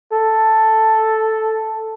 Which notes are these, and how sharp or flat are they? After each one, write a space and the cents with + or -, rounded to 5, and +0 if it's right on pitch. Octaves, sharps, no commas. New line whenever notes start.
A4 +0